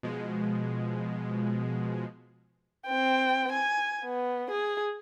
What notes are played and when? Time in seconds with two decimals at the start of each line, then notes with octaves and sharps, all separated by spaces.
0.03 B2 F3 G#3
2.87 C4 G5
3.52 G#5
4.04 B3
4.50 G#4